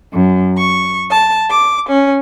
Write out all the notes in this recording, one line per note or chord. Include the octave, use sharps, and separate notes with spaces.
F#2
C#6
A5
D6
C#4